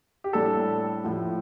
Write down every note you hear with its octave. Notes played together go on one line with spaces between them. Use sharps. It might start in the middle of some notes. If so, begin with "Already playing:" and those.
G4
A2 G3 D4 A4
A2 F3 A3